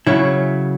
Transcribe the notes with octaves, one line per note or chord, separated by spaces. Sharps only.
C#3 F#3 C#4 E4